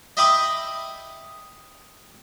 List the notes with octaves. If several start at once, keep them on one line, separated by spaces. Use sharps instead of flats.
D#5 E5 G5 B5 D6 D#6